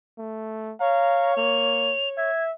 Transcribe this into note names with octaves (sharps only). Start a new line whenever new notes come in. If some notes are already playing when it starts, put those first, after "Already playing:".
A3
C#5 F5 A#5
A#3 F7
E5 G#6